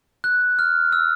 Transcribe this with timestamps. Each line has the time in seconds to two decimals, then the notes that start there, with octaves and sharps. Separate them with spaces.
0.24 F#6
0.59 F6
0.93 E6